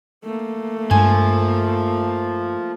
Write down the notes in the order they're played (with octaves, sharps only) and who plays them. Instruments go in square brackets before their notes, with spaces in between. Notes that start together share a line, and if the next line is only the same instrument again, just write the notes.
[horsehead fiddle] A3 A#3
[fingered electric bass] G2 G#3 [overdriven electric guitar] F3 [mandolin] G#5